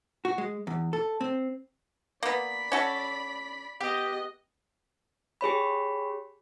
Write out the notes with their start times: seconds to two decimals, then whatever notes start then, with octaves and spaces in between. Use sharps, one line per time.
0.25 F#4
0.38 G#3
0.67 E2
0.93 A4
1.21 C4
2.23 A#3 B3 D5 B5
2.72 C#4 F#4 A4
3.81 B3 G4 D#5
5.41 G4 G#4 C#5 B5